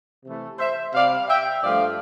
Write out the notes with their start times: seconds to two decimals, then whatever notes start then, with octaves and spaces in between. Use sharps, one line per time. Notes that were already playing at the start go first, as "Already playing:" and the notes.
0.25 C3 E3 A3
0.59 C5 E5
0.94 C3 G3 D5 F5
1.28 E5 G5
1.63 G2 F3 A3 D5 F5